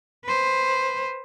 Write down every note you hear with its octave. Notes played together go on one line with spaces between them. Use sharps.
B4 C5